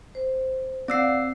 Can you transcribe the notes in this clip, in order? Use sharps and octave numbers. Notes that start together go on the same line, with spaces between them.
C5
C4 D5 F5 F#5 E6 C7